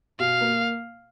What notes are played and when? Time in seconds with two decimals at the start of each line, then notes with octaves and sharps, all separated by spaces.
0.20 B2 F5
0.41 A#3